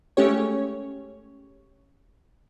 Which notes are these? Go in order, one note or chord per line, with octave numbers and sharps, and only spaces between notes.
G#3 A3 C#4 G4 C#5